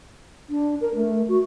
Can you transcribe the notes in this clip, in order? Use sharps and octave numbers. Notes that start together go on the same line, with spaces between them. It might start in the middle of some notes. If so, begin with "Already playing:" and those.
D4
A#4
A3
F#4